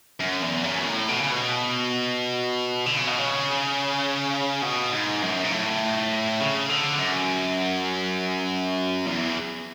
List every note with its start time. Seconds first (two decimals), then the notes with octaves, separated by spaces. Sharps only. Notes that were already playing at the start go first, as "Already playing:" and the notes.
0.20 F#2
0.42 E2
0.64 F#2
0.77 B2
0.86 A2
1.08 B2
1.20 C#3
1.31 B2
2.86 D3
2.97 C#3
3.07 B2
3.19 C#3
4.62 B2
4.92 G#2
5.22 F#2
5.44 G#2
5.51 A2
6.40 C#3
6.69 D3
6.99 F#2
9.06 E2